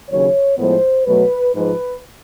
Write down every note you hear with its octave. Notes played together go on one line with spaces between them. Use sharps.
D#2 C#3 F#3 C#5
A2 F3 G#3 B3 C5
B2 F#3 A3 B4
G#2 F3 G#3 B4